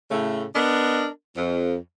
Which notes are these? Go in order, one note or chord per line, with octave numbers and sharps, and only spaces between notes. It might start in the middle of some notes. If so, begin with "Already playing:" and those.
A2 C#3 A3
B3 D4 A#4 D#5
F2